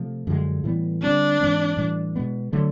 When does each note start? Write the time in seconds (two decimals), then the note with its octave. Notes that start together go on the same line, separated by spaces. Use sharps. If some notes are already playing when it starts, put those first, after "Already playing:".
Already playing: C3 F3 A3
0.27 F#2 D3 F3 G#3
0.64 A2 E3 G3 B3
1.02 D3 G3 C4 D4
1.40 G#2 E3 G#3 C4
1.77 A2 E3 G3
2.16 B2 G#3 B3
2.53 D3 F#3 A3